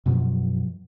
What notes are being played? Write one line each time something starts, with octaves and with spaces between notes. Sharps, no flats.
F#2 B2 F3 F#3